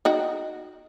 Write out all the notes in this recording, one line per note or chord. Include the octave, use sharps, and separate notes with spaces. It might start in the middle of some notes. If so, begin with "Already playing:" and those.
D#4 F#4 G5